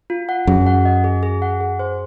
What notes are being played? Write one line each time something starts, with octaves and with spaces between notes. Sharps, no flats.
F4
F#5
F#2 G#4
F#5
D#5
G#4
G#4
F#5
G#4
C5